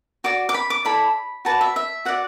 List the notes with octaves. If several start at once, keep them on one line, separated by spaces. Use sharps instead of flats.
F#4 D5 D6
D6
B5
D6
E4 A4 D5 B5
F#4 B4 D5 A5
E5
E5
F#4 D5 F#5